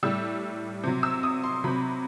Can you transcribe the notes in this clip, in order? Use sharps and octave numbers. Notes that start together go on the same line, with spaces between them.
A2 G3 E6
C3 F#3
E6
D#6
C6
C3 F#3 B5